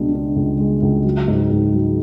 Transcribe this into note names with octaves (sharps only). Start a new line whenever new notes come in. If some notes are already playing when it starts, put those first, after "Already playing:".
Already playing: C#2 B2 G#3 D4
D4
C#2
G#3
C#2
F#3
G#2
G#2
F#3